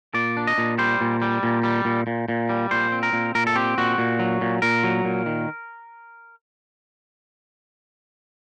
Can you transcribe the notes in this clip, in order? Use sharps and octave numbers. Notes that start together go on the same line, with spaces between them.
A#2 D5
D4
D#5
A#2
G3 C5
A#2
G3
A#2
G3
A#2
A#2
A#2
G3
A#2 C5
C4
A#4
A#2
A#2 A#4
A4
C4 G4
A#2 F#4
A#2
F#3
A#2
A#2 A#4
F#3
A#2
D#3